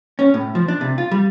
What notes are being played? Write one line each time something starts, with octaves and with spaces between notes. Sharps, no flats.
C#4
A2
F3
D4
C3
F4
G3